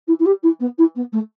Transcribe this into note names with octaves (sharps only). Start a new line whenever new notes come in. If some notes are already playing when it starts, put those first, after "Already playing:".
E4
E4
G4
E4
B3
E4
B3
A3